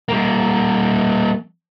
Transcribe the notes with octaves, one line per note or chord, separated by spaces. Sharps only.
G3 A#3